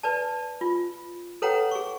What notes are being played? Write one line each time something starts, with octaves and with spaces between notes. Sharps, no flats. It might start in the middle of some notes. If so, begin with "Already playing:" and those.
B4 D5 A5
F4
A4 B4 C#5 F#5 G5 A#5
G#4 C#6